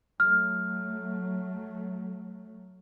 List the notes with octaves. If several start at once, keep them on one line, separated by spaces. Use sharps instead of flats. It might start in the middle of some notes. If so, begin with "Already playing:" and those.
F#3 A3 F6